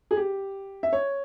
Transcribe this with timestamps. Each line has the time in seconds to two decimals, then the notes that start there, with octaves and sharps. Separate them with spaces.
0.11 G#4
0.16 G4
0.83 E5
0.93 C#5